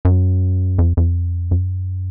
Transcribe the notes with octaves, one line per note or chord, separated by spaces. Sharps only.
F#2
F2
F2
F#2